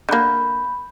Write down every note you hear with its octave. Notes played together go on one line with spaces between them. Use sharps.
D3 A#3 B5 G6